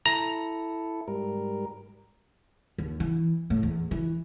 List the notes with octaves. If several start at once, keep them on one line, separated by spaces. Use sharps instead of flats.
E4 A4 A#5
G#2 G3 A#4
D#2
E3
A2
E2
E3